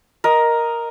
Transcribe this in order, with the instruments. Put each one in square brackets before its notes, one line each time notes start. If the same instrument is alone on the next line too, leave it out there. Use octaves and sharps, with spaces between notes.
[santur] A#4 D#5